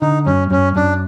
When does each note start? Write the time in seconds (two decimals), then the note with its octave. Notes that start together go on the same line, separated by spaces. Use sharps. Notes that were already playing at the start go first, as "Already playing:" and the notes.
0.01 D3 D#4
0.26 F#2 C#4
0.50 F#2 C#4
0.76 F#2 D4